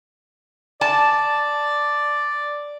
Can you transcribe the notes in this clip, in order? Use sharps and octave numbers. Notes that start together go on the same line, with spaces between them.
D5 A5